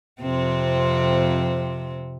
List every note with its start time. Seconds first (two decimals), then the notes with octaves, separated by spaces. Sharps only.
0.21 F2 C3 C4